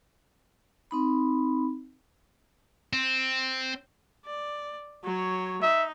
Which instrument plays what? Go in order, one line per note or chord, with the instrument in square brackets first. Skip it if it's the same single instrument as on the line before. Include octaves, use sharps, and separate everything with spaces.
[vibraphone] C4 D#4 B5
[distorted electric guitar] C4
[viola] D5
F#3 C#5
[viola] D#4 [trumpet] E5